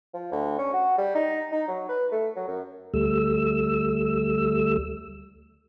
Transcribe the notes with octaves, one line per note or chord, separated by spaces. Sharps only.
F3
D2
C#4
F#4
G3
D#4
D#4
F#3
B4
A3
F#3
F#2
D2 G3 A3 E6